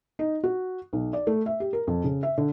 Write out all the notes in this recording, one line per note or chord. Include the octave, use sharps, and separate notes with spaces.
D#4
F#4
B1
D5
A3
E5
G4
A#4
F2
C#3
E5
D3